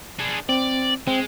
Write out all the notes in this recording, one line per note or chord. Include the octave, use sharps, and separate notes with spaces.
D4 G#4
C4 D5
G#3 C4